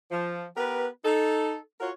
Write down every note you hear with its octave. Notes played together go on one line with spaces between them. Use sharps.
F3
B3 G4 A#4 B4
D#4 A4
F4 F#4 A#4 C#5